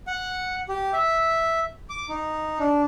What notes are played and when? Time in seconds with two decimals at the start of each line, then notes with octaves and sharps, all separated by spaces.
0.07 F#5
0.69 G4
0.93 E5
1.90 D6
2.09 D#4
2.59 D4